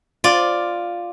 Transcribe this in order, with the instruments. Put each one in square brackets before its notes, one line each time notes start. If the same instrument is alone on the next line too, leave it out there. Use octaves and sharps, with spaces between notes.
[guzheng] F4 D5